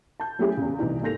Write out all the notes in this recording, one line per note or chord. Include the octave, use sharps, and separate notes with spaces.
A5 G6
F#3 A3 C#4 E4 G4 G#4
E2 C#3
C2 E3 D#4
G#2 A#3 A4 G6 A#6 F7